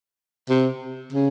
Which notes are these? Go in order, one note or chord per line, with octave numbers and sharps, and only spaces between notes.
C3
C#3